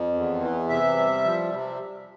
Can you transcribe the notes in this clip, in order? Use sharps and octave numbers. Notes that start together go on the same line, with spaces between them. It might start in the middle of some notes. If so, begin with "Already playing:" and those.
Already playing: F2
E2
E3
C3 E5
G3
F3
C3